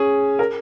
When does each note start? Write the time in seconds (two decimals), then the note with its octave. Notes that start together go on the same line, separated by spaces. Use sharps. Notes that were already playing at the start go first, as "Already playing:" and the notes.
Already playing: C#4 G#4
0.39 A#4